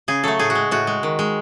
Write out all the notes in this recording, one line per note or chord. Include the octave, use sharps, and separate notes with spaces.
C#3 G#4
F#3 A3 A4
A2 G#4
F#4
G#3
A2 F#4
G#3
D#3
G#3